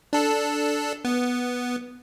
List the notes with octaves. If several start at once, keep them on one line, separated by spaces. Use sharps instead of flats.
D4 A4
B3